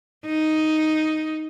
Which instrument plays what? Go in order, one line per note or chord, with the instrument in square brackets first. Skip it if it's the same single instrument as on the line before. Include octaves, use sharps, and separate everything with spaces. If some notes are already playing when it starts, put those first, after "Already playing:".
[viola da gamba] D#4